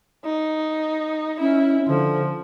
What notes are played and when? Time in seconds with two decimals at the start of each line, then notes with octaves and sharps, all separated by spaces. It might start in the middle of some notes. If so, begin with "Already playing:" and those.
0.25 D#4
1.41 C#4 E4
1.88 D3 F3